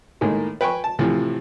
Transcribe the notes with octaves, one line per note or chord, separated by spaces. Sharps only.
A2 D#3 G#3 A#3
B4 G5 G#5 C#6
A5
A2 C3 E3 F3